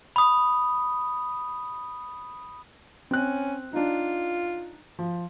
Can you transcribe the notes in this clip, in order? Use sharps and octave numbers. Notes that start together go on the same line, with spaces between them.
B5 D#6
C4 C#4 F#6
D4 D#4 F4
F3